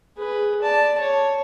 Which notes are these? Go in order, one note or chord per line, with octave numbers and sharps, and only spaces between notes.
G#4 B4
D5 A5
C#5